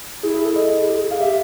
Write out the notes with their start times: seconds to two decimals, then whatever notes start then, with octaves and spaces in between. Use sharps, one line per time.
0.23 E4 G#4
0.34 G#4
0.45 A4
0.56 D#5
0.81 G#4
0.88 G4
0.96 G#4
1.11 G#4 F5
1.21 G4 E5